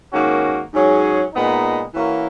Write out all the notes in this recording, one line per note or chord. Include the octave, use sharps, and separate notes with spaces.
G#2 D#3 A#3 C#4 F#4
G#2 F#3 C#4 G#4
A#2 G#3 B3 D#4
E3 A#3 C#4 F#4 A#4